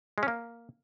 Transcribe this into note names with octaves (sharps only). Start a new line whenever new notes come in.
G#3
C#4
A#3